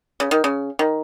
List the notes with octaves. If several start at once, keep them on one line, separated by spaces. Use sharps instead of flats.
C#3
D#3
C#3
D#3